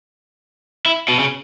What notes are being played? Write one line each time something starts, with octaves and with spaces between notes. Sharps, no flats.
E4
B2
C#3